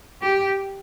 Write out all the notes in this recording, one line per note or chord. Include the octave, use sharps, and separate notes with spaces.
G4